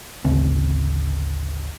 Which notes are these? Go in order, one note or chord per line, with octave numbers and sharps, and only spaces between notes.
G#1 D2 C#3 C4